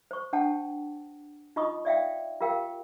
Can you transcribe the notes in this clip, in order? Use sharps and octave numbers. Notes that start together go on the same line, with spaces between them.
C5 C#6
D4 F#5 G5 A5
D#4 F4 D#5 B5 C#6 D#6
D5 E5 F5 G5
F4 G4 A#4 F5 G5